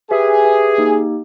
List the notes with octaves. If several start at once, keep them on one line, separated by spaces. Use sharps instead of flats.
G4 G#4 B4 E5 G#5
G4 B4 E5 G#5
A#3 D#4 G4